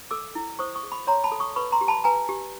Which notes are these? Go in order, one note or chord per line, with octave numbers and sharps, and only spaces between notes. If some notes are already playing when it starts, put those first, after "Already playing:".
A4 D6 E6
E4
C5 C#6 D#6
C#6 D#6
G#4
B5 C#6
C#5 A#5 C6
A5 B5
A4
C#6 D#6
B4 B5 C#6
A#5 C6
G4
A5 B5
B4 G#5 A#5
G4